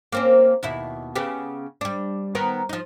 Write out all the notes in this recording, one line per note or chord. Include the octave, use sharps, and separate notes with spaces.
A#3 C4 C#4
D#2 B2 E4
C#3 B3 G4
G3 D4
D#3 B3 A#4
F3 D#4